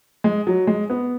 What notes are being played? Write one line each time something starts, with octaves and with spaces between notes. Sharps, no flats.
G#3
F#3
G#3
B3